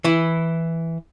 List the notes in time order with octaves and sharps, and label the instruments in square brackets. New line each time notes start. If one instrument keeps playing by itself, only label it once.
[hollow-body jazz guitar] E3 E4